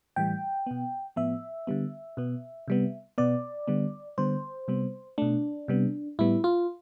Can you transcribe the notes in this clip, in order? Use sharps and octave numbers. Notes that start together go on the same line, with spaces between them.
A2 E3 G3 G5
B2 B3
A2 F3 B3 E5
D3 G3 B3
B2 B3
C3 G3 B3
B2 B3 D5
D3 G3 B3
D3 G3 B3 C5
C3 G3 B3
B2 A3 D4
C3 G3 B3
A2 G3 B3 E4
F4